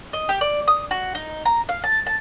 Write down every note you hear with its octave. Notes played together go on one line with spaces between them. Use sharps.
D#5
G4
D5
D#6
F#4
D#4
A#5
F5
A5
A5